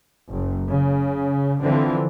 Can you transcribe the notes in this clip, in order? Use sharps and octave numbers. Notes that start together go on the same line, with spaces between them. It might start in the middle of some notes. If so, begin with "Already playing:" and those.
F#1
C#3
D3 E3 F3 C4